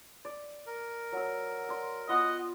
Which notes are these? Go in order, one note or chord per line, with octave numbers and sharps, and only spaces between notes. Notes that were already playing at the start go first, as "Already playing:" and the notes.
D5
A#4
F#3 E6
D5 C6
B3 F4 D#5 F#5